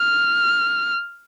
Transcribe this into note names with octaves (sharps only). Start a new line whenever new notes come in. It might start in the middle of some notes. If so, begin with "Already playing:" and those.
Already playing: F6